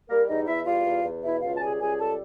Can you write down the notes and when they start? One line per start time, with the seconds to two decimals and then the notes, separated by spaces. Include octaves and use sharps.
0.09 G3 A#3 A#4
0.27 E2 D#4 D#5
0.47 E2 E4 E5
0.66 G3 F4 F5
0.85 E2
1.04 E2
1.22 B2 E4 E5
1.42 C#2 F4 F5
1.56 A5
1.61 G3 G#4 G#5
1.80 C#2 G#4 G#5
1.99 G3 A4 A5